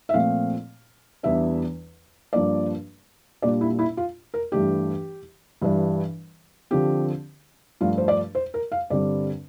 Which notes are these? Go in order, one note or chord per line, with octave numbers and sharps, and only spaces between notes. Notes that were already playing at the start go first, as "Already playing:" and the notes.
E5
A#2 F3 A3 C4 F5
E2 E3 G3 D4 E5
G2 F3 A#3 D4 D5
A#2 G3 A#3 D4 D5
E4
E4
F4
A#4
G2 E3 A3 D4 G4
G2 E3 G3 D4
D3 F3 C4 G4
G2 F3 A3 D4 F4
C5
D5
C5
A#4
F5
G2 D3 G3 C4 D5